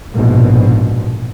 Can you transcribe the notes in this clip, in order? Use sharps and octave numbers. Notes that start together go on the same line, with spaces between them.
A#1 G#2 B2